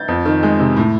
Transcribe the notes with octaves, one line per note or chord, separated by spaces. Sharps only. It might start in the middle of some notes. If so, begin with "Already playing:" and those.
Already playing: G6 A6
F2
D#3
G#3
C3
A2